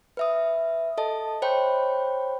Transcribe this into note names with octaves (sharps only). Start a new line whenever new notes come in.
B4 E5 D#6
A4 D#5 A5
C5 C#5 G5 B5